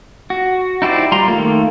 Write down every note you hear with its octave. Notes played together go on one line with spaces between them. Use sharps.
F#4
D#4 E4 G4 C5 D5
G3 F4 A#5 C6
D#3 A3 A#3